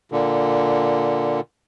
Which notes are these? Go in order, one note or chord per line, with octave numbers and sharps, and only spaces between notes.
A#2 D3